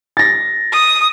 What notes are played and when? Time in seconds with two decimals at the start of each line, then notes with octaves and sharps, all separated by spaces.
0.17 A6 A#6
0.72 D#6